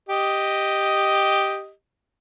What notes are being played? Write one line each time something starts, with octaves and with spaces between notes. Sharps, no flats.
G4 D#5